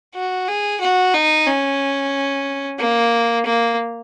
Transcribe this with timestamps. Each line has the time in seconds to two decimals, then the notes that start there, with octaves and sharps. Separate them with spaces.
0.14 F#4
0.48 G#4
0.81 F#4
1.14 D#4
1.47 C#4
2.79 A#3
3.46 A#3